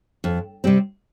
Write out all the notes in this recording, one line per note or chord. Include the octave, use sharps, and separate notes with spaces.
F2
C3 G3 C4